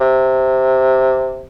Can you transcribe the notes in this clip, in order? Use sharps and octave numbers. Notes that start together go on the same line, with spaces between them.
C3